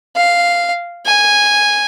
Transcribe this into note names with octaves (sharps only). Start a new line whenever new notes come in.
F5
G#5